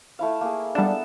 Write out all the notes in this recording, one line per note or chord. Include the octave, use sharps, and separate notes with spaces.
A3 E4 F5
A#3 G#4
G3 B3 D4 A4 A5